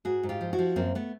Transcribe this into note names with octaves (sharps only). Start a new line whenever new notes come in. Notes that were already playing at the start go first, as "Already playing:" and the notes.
G#2 F#4 G#4
G#2
F4 G4
F3
E4 F#4
F3
F#2 A#3 C4
A3 B3